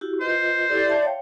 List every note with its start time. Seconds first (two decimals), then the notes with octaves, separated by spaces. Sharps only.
0.01 E4 F#4 G4
0.21 F4 B4 C5 D#5
0.69 E4 G4 A4 D5
0.86 E5 A5
1.02 C#5 F5 G5